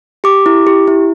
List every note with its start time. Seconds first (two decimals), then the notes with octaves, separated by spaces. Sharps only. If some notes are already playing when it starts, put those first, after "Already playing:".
0.24 G4 D6
0.46 E4
0.67 G4
0.87 E4